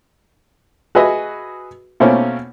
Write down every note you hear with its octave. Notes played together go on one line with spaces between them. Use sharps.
F#4 G#4 B4 D#5 E5
B2 A3 A#3 C4 C#4